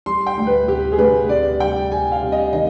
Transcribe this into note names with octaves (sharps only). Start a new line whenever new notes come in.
G3 C6
G5
D2
B4
C3 G4
G#4
D2 B4
C3 D5
G3 G5
G3 G#5
F5
C3
D#5
D#3 D#5